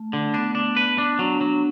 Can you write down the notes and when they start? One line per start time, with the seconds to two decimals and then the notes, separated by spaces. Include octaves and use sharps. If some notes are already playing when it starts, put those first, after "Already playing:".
Already playing: A3
0.13 D3
0.34 B3 D4
0.55 D4
0.76 B4
0.98 D4
1.19 F#3 D4
1.41 F#3